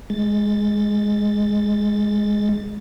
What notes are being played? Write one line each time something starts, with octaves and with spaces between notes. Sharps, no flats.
G#3 A6